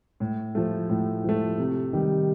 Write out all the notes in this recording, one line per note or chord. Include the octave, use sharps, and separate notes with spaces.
A2
F3 A3
A2
F3 A3
C3
D#3 G3